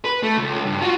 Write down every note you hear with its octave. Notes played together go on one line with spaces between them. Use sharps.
B4
A3
C#2
G2
F4 F#4